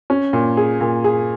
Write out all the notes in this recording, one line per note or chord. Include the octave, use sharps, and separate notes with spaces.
C#4
A#2
G#4
A#2
G#4